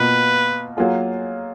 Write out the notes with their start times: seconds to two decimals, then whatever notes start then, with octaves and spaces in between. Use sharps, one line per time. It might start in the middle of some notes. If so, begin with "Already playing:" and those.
Already playing: B2 A#3 F4 B4
0.77 F#3 A#3 F4 G#4